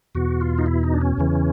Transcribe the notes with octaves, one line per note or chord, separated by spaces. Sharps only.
E2 B2 F#4
F4
D#4
E4
D#4
D4
C#4
E2 C#3 E3